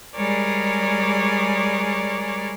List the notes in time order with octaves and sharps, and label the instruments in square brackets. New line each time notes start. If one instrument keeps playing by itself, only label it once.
[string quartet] G3 G#3 G#4 A#4 C#5 D5